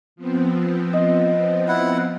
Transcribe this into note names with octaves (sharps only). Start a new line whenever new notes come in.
F3 B3 C4
D#5
E4 F#5